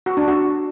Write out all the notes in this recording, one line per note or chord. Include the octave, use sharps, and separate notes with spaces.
F#4
D4
F#4